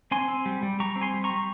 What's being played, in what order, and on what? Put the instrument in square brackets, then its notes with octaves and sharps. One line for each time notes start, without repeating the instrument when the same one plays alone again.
[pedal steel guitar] C4 G#5 C6
C4
G3
G3
G3 A#5 C#6
C4
G#5 C6
G3
A#5 C#6
G3